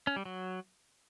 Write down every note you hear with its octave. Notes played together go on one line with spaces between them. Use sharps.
C#4
G3
F#3